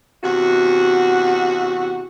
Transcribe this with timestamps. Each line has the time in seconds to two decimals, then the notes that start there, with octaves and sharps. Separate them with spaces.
0.23 E2 C3 F#4